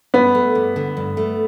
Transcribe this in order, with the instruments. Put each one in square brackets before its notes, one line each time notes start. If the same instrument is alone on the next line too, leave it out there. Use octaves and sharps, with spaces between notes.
[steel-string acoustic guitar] G2 [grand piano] B3
[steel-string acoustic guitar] A3
G2
D3
G2
A3